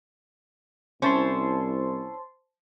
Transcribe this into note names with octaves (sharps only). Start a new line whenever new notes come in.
C2 C#4 E4 C5 A5 C6